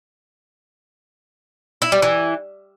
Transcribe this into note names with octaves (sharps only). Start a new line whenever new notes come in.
E4
G3
E3